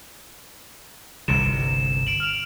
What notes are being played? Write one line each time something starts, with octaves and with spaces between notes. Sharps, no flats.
G1 C2 C3 E7
D7 E7 F#7
F6 F7